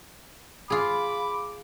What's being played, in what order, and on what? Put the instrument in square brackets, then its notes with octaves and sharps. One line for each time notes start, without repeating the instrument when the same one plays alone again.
[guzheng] F4 G#4 [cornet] B5 [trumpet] D6